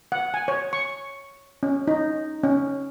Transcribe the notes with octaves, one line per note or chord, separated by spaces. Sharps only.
F#5
G#5
C#5
C#6
C#4
D#4
C#4